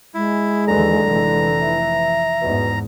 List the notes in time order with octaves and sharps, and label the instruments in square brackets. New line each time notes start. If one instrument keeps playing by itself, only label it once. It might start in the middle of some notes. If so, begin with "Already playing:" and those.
[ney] G#3 [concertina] E4
[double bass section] D#2 E3 F#3 [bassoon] D3 [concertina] A#5
[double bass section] F1 E3
[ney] E5
[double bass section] E2 G#2 [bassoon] B2